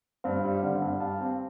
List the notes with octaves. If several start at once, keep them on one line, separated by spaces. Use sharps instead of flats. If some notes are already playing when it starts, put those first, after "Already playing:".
G2 C5 F5
G3
D3
G2
G4 F5 A5
C4